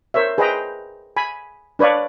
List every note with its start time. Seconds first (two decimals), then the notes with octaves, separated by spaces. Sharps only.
0.14 A#4 C5 C#5 E5
0.38 G#4 B4 C5 D#5 G5 A#5
1.17 G#5 B5
1.79 D4 B4 C#5 D5 F5